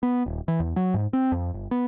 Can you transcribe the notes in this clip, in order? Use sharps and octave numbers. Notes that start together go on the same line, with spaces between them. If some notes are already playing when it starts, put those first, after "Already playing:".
B3
D#1
E3
E2
F#3
G#2
C4
F2
G1
B3